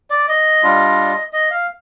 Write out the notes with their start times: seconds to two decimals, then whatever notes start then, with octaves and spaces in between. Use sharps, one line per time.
0.10 D5
0.28 D#5
0.63 G3 D4 F4
1.33 D#5
1.51 F5